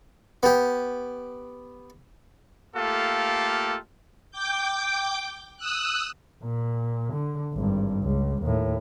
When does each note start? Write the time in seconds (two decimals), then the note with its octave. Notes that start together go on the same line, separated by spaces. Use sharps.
0.43 B3 G4
2.76 A3 A#3 F4 G4 A4 F5
4.31 G5 D6 G6
5.57 D#6 E6 F#6
6.43 A#2
7.13 D3
7.53 G#1 G2
8.01 C#2
8.42 D#2 A2